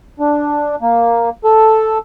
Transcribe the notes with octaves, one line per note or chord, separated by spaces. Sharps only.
D4
A#3
A4